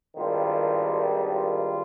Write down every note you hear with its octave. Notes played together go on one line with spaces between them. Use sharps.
G#1 G2 D#3 G3 F4
F4